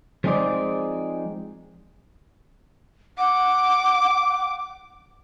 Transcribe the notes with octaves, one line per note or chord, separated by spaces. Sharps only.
F3 G#3 C4 D#4 G#4 D5
F#5 D6